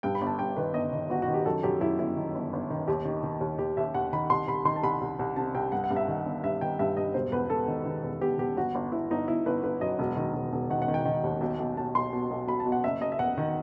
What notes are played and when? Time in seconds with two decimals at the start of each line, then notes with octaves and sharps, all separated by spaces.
0.03 G2 G5
0.15 B5
0.21 G1
0.27 A5
0.39 G2 G5
0.57 D#3 B4
0.74 G1 D#5
0.93 D#3
1.10 G1 F#4
1.22 F#4
1.28 D#3
1.34 G4
1.46 F#2 A4
1.63 F#2 G4
1.81 F#2 E4
1.99 G1 E4
2.17 D#3
2.35 G1
2.53 G1
2.70 D#3
2.87 D#2 G4
3.05 D#3
3.24 D#3
3.41 D#2
3.59 D#2 G4
3.77 D#2 E5
3.94 D#2 F#5
4.13 D#3 B5
4.30 C2 C6
4.47 C2 B5
4.65 D#3 C6
4.76 A5
4.83 C2 B5
5.01 C2
5.19 C2
5.36 C3 A5
5.55 C2 G5
5.72 G2 F#5
5.84 F#5
5.91 G2
5.96 E5
6.08 D#3
6.25 G1
6.43 G2 E5
6.61 D#3 G5
6.79 G2 E5
6.97 G2 D#5
7.14 E1 C5
7.32 E2 B4
7.50 E1 A4
7.68 D#3
7.86 D#3
8.04 E2
8.21 E2 G4
8.39 E2 G4
8.57 G1 F#4
8.75 G1
8.92 G1 E4
9.10 G1 D#4
9.28 G1 E4
9.46 G1 B4
9.63 G1 B4
9.81 F#2 D#5
9.99 E1
10.17 D#3
10.35 E1
10.53 E1
10.70 D#3 F#5
10.82 F#5
10.88 D#3
10.94 G5
11.05 D#3
11.24 D#2
11.41 B1
11.59 B1
11.77 B1 A5
11.95 B1 C6
12.13 B2
12.31 B1
12.48 B1 B5
12.60 A5
12.66 B2
12.72 F#5
12.84 F#1 E5
13.01 F#1 D#5
13.12 E5
13.19 E2 F#5
13.38 D#3